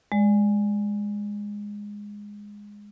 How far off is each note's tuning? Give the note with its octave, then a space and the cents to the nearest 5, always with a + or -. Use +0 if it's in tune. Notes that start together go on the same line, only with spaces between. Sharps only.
G#3 -10 D5 +0